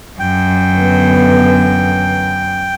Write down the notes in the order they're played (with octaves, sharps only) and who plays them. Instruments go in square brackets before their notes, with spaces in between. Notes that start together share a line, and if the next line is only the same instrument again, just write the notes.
[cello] F#2 [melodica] G5
[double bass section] D3 E3 B3